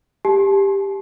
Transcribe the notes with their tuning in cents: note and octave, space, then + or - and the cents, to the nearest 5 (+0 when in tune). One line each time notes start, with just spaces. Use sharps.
G4 +10 A5 -45